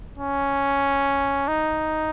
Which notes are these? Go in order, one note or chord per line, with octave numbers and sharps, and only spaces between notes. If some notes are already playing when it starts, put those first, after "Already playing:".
C#4
D#4